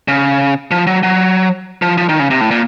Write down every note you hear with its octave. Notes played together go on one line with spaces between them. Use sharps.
C#3
F3
F#3
F#3
F3
F3
D#3
C#3
C3
A2
A#2